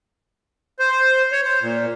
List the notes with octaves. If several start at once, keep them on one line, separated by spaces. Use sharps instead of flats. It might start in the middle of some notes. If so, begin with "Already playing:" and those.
C5
C#5
C5
A#2